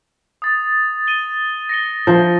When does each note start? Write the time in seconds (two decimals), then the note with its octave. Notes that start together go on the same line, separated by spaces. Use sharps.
0.42 D#6 A6
1.08 D#7 G7
1.69 A#6 C#7 G7
2.07 F3